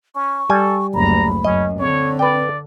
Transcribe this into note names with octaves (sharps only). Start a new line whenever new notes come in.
C#4 C#6
G3 A4 G#5
F#1 D2 A#5 B5
F#2 C#4 D#5
D3 C4 C#5
B4 D5 G5